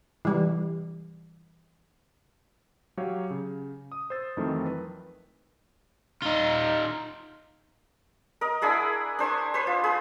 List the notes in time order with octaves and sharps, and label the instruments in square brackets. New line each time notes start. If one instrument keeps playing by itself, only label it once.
[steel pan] E3 G3
[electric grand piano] F#3 G4 C#5 F5
C#3
D#6
C5 E6 A6
F2 D#3 E3 F#3 A3 C4
B4
[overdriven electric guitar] D#4 F4
[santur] A#4 D#5
D4 E4 G#4 F#5
D4 C5 G#5 C#6
B4 C5
F4
G#4 B4